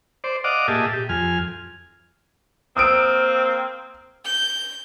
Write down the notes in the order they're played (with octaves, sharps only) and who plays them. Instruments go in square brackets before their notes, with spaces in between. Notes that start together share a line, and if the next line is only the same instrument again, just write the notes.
[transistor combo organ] C5 D5
D5 D#5 F5 F#5 D6
A#2 G4 G#4 D#5 E5 A5
G4
F2 G#5 F6
[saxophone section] A#3 C4 [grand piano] D#6 E6 D7
[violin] G6